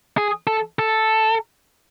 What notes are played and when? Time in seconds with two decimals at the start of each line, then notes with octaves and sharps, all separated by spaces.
0.17 G#4
0.47 A4
0.79 A4